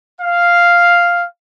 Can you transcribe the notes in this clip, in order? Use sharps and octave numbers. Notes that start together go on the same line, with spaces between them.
F5